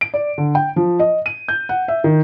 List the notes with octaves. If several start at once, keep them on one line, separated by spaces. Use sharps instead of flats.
D7
D5
D3
G5
F3
D#5
D#7
G6
F#5
E5
D#3